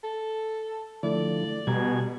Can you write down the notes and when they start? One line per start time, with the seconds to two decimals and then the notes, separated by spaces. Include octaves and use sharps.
0.04 A4
1.03 D3 F3 A3 E4 A4 D5
1.67 B2 G3 G#5 A#5 G#6